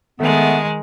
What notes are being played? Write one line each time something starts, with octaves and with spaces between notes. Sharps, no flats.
D#3 G#3 A3 B3